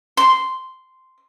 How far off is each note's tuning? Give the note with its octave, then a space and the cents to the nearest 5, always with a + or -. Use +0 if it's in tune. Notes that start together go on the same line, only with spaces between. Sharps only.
C6 -10